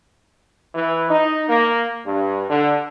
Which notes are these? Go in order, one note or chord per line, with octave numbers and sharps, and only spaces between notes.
E3
D#4
A#3
G2
D3